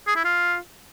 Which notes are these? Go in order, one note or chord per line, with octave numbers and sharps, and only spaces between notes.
G#4
E4
F4